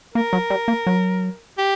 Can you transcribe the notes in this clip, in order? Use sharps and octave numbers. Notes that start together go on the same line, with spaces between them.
A#3 A#4
F#3
G3
A#3
F#3
G4